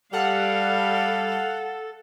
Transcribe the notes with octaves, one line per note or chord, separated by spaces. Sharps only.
G3 A4 F5 F#5